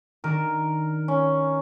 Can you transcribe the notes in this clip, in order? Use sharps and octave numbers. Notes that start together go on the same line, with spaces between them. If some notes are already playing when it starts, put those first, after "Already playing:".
D#3 D4 A#4
C#4